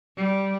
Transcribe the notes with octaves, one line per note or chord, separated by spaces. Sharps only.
G3